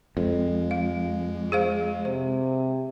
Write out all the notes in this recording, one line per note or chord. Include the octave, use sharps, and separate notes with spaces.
F2 G#3
F5
G#4 C5 F5
C3 C5